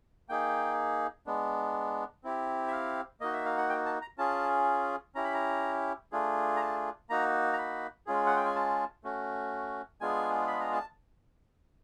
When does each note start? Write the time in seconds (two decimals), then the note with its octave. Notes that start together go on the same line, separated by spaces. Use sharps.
0.29 A#3 D#4 G#4 G5
1.26 G#3 B3 D4
2.24 C4 E4 G4
2.67 E5
2.72 F5
3.21 A#3 D#4 F#4 D#5
3.33 E5
3.45 F5
3.57 F#5
3.69 G5
3.86 A5
4.02 A#5
4.18 C#4 F4 G#4 A5
5.15 C#4 E4 G4 A#5
5.24 B5
5.34 A#5
6.12 A3 D4 F4 G#4
6.56 A#5
6.61 A5
7.10 A#3 D#4 F#4 A#5
7.53 A#5
7.58 B5
8.06 G#3 C#4 F4 G#4
8.26 F#5
8.36 G5
8.45 G#5
8.55 A5
9.04 A3 C#4 F#4
10.01 G#3 B3 D4 F4 G#4 G#5
10.47 B5
10.60 A#5
10.73 A5